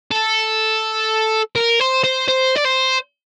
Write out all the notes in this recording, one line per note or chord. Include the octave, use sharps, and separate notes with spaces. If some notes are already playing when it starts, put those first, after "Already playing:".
A4
A#4
C5
C5
C5
D5
C5